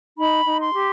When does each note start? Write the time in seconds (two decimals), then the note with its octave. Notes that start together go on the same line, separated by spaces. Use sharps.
0.18 D#4 B5
0.46 D#4
0.60 C6
0.74 G4